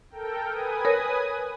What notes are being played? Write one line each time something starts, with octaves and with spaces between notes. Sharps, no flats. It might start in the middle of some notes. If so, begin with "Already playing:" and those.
A4 A#4 G5
B4 G#5 D#6
A#4 C#5 A#6